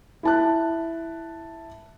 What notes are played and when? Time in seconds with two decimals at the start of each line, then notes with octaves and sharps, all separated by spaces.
0.23 E4 A5 F#6